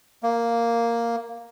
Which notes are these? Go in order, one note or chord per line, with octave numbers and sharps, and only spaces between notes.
A#3